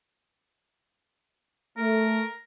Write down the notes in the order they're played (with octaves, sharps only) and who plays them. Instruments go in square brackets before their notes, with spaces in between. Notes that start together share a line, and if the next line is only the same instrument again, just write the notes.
[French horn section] A3 [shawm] A#4